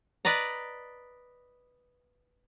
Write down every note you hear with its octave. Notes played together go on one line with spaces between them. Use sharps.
B4 D5 D#5 A#5